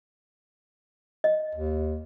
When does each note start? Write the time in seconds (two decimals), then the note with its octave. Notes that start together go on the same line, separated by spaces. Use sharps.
1.24 D#5
1.55 D#2